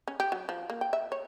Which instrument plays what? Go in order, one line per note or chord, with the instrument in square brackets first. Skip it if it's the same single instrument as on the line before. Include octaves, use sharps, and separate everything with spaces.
[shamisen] C#4
G4
F#3
F3
A#3
G5
E5
C#5